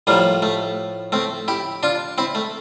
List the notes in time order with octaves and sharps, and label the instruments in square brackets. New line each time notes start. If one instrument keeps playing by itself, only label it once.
[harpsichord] A2 F3 G3 A#3
A3
A3 C4
E4 G4
D4 F4
C4 E4
A3